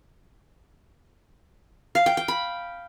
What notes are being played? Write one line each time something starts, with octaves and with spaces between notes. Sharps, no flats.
F5
G5
G5
B5